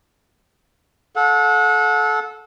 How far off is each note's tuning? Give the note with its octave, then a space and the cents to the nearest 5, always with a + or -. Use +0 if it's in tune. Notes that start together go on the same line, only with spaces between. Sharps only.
A4 -25 F#5 -35